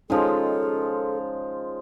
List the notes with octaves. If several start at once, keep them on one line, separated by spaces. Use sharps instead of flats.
F3 G#3 C#4 D#4 G#4 A4